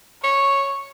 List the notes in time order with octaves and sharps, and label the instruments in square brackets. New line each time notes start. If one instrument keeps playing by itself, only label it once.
[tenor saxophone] C#5 [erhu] C#6